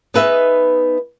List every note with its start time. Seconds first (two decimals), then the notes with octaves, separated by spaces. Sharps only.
0.14 B3 D#4 G#4 B4 D#5 E5